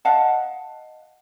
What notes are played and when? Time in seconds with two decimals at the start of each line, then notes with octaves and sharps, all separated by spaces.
0.05 D#5 F5 F#5 A5